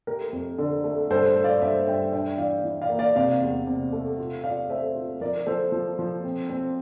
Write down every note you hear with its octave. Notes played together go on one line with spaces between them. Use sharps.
A3 G4 A#4
F2
D3
A3
G2 A4 C5
A3
D5 F5
G2 C5 E5
G2 E5 G5
D4 E5 G5
E3 D5 F5
E3
D5 F5
A#3
D5 F5
C3 D5 F5
E2
C3
A3
F4
F4 D5 F5
A3 C5 E5
F4
F3 A#4 D5
F3 A4 C5
F3
F3
C4
C4